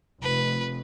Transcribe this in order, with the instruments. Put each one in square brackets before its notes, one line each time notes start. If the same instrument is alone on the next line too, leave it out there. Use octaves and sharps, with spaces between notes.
[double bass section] F1 [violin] B4